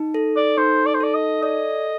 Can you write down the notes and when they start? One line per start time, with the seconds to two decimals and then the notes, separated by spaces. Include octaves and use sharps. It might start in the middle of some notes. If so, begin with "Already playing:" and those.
Already playing: D#4
0.14 A4
0.36 D5
0.58 D#4 C5
0.86 D5
0.94 C5
1.00 A4 D5
1.14 D#5
1.43 D5 D#5